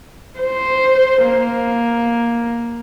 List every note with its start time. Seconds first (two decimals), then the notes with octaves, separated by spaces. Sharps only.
0.40 C5
1.27 A#3